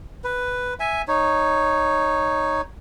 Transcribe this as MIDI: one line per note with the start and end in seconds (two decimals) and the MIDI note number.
0.24 0.74 71
0.80 1.02 76
0.80 1.02 80
1.08 2.61 63
1.08 2.61 73